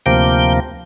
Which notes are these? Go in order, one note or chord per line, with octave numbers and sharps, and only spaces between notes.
D2 C3 F3 A#3 G5